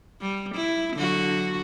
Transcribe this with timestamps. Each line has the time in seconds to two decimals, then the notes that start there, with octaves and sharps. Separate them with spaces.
0.21 G3
0.55 E4
0.95 D3 F#3 F#4